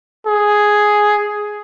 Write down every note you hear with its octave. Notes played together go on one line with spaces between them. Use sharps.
G#4